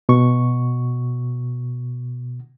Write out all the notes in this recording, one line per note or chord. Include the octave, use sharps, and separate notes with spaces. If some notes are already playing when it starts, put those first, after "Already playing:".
B2 C#6